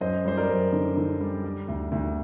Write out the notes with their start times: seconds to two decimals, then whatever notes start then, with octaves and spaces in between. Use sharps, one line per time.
0.01 F#2 C5 D#5
0.25 G3 C5
0.37 A#4 D5
0.49 F#2
0.73 D3
0.97 D3
1.20 G3
1.44 G3
1.68 D2
1.92 D2